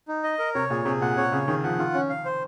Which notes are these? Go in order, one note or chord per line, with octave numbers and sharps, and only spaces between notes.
D#4
D#5
A#4
C3 C#5
A#2 G#4
C3 G#4
A#2 F#5
C3 C#5
C#3 G#4
D#3 G#4
F3 F#5
D#3 F4
C#4
F5
C5